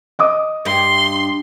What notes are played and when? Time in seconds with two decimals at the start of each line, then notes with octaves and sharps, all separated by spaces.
0.19 D#5 D6 D#6
0.65 G2 C6